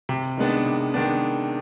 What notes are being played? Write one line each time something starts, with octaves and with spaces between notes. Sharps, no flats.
C3
D#3 G#3 B3 D4
C3
D#3 G#3 B3 D4